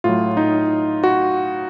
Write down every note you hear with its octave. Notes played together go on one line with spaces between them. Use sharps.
A2 F#3 F4
D#4
F#4